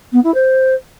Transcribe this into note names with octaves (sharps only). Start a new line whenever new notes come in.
B3
E4
C5